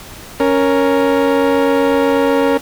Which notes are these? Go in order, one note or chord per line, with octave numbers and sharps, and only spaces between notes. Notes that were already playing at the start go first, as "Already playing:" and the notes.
C#4 A#4